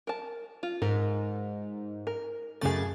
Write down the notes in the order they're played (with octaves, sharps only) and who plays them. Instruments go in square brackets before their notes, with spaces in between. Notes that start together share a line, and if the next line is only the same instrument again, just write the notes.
[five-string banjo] A#4 A5
F4
[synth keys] G#2 [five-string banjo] A#4
[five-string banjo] A#4
[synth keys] F#2 C#3 A6 [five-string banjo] A3 G#4